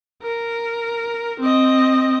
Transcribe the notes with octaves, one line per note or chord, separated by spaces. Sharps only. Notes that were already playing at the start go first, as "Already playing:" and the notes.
A#4
C4 D#5